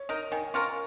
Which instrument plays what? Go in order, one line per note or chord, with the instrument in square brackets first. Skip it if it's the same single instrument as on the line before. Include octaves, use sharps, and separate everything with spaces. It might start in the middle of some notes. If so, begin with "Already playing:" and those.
Already playing: [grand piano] C#5
[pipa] D#4 A#4 [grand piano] D#5
[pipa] D#3 [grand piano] G#5
[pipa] C#4 F4 A#4 [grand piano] C#6